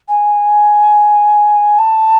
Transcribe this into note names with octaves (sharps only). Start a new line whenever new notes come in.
G#5
A5